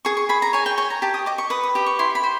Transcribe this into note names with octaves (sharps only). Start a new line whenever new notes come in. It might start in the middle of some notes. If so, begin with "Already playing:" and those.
G#4 C#6
C#6
G#4 B5
A#5
C#5 G#5
G5
C#5 G#5
A#5
G4 A5
D#6
D#5 D6
C#6
B4 D#6
D#6
G4 D6
C#6
E4 C6
B5
C5